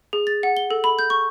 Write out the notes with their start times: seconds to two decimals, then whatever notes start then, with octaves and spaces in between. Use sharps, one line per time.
0.13 G#4
0.27 A6
0.43 F#5
0.57 G7
0.71 A4
0.84 B5
0.99 G6
1.10 C#6